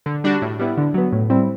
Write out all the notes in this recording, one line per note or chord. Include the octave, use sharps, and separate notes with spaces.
D3
G3 D4 F#4
A2
G3 B3 E4
D3
F#3 B3
A2
G3 C4 E4